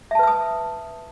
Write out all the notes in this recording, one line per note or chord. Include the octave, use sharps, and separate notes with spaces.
B4 E5 A5 D#6 E6